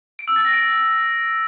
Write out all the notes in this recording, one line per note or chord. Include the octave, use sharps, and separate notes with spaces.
D7
E6
A6
A#6
D7